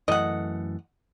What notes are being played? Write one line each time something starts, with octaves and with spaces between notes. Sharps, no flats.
F#2 E3 A3 D#5 F#5